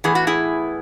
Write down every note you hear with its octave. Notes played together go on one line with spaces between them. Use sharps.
A2 E3 B3 G#4
F#4
E4 G#4